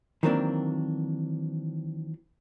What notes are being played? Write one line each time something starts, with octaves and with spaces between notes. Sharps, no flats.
D#3 E3 F#3 A#3 C4 D4